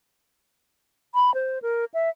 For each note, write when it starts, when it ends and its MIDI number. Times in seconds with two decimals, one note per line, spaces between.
1.14 1.34 83
1.34 1.59 72
1.62 1.85 70
1.94 2.09 76